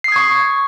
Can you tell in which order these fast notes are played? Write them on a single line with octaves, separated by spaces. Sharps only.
C7 D#6 G#6 C#6